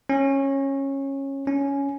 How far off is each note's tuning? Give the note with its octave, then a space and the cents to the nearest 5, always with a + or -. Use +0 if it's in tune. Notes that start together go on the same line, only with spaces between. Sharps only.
C#4 -15
C#4 +10